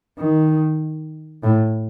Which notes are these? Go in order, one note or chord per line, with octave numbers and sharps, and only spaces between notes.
D#3
A2